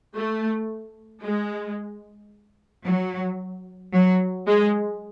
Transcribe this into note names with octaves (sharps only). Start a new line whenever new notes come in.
A3
G#3
F#3
F#3
G#3